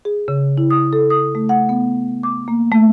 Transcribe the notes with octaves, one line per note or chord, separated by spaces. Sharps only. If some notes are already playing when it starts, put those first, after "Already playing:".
G#4
C#3
E4
D#6
A4
D#6
A3
F#5
B3
D6
A#3
A3